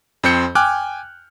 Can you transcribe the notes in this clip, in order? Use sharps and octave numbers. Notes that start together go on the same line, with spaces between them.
F2 C4 C5 G6 C#7
G5 G#5 D6 F6 F#6